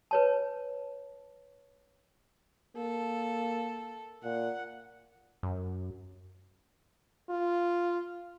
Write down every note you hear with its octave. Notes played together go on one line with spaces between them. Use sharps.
B4 C#5 A5
A#3 A4
A#2 F#5
F#2
F4